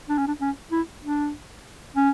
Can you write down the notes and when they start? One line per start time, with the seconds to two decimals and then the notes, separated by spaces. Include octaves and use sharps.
0.09 D4
0.18 C#4
0.27 D4
0.41 C#4
0.72 E4
1.03 D4
1.96 C#4